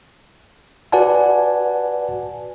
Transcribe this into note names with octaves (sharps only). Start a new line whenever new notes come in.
F#4 B4 D5 F#5 G#5 A5